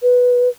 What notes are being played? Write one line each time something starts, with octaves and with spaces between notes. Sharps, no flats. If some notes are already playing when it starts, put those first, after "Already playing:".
B4